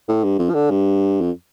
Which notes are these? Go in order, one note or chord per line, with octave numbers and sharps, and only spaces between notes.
A2
G2
F2
F3
D3
G2
F2